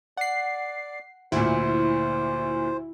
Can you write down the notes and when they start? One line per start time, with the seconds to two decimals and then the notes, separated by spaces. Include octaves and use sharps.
0.17 D5 F#5 C7
1.32 D2 A#2 E4 C5